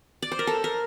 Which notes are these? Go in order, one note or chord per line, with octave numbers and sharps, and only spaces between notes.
D5
C5
A#4
A4
A#4